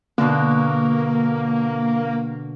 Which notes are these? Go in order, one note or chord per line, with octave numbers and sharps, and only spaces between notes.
B2 D3 A#3